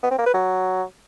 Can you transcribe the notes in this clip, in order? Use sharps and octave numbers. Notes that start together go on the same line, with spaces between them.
B3
C4
A#3
B4
F#3